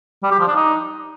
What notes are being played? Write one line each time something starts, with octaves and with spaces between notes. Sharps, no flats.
G3
G4
F3
D4
D#4